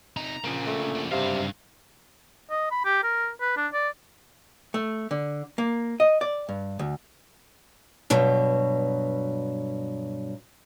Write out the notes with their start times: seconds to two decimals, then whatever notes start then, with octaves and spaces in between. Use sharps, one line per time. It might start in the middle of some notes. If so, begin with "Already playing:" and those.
0.17 C3 D#4 A#5
0.44 C#3 F3 A#3
0.67 A3
0.95 C#3 F#4
1.12 G2 C3 F5
2.50 D#5
2.71 B5
2.85 G4
3.03 A#4
3.41 B4
3.57 D4
3.73 D5
4.74 A3
5.11 D3
5.58 A#3
6.00 D#5
6.21 D5
6.49 G2
6.79 D2
8.10 G2 B2 F#3